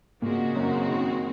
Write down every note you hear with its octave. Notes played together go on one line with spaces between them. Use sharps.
A#2 C#3 G#3 A#3 C4 F#4
F#2 F#3
D#3